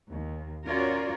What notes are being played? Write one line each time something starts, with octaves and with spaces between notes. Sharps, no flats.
D#2
C#4 F4 F#4 A#4 C#5 D5